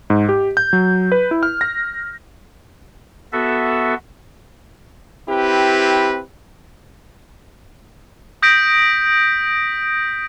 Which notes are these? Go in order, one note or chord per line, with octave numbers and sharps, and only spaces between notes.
G#2
G4
G6
F#3
B4
E4
F6
A#6
B3 F#4 A4 E5
C4 E4 G4 B4
D#6 G6 A#6 B6 D7